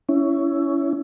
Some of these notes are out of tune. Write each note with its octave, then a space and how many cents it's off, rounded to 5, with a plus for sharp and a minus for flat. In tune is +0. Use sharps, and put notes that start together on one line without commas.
C#4 +20 E4 +10